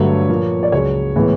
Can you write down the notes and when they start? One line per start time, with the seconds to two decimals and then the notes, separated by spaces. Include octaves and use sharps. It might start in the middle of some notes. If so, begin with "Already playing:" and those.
Already playing: G2 D3 F#3 A3 C#5
0.29 A#2 F3 A#3
0.63 D5
0.72 C#2 C#3 F#3 C#5
1.16 A2 E3 G#3 B3